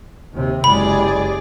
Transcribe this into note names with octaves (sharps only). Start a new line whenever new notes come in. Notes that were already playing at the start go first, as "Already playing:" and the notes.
D#2 C3
F#1 G#3 G4 G#4 D5 B5